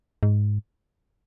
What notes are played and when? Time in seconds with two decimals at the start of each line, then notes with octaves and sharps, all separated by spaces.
0.23 G#2